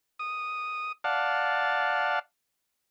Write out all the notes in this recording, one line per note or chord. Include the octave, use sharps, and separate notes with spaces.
D#6
D5 F5 F#5 A5